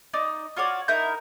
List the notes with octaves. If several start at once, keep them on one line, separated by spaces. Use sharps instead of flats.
D#4 D5 D#5
F4 F#4 C#5 D5
D#4 E4 A#4 G6